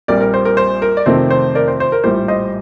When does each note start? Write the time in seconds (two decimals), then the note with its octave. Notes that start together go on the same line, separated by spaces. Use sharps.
0.08 A#1 A#2 G3 C4 A#4 D5
0.21 A#4
0.34 C5
0.45 A#4
0.57 C5
0.82 A#4
0.97 D5
1.06 F2 C3 D#3 A3 C4 C5
1.31 C5
1.55 A#4 D5
1.68 C5
1.80 C5
1.92 A#4
2.04 A#1 A2 G3 C5
2.28 C5 D#5